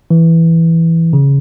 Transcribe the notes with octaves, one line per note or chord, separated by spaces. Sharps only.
E3
C#3